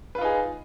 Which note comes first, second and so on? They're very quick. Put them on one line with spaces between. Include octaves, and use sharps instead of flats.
B4 F4 D#4 G#4